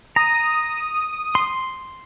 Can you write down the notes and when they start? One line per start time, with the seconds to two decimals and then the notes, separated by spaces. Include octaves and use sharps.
0.16 A#5 D#6
1.35 C6